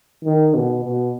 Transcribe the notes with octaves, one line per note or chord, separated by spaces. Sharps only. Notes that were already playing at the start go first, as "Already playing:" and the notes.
D#3
B2
B2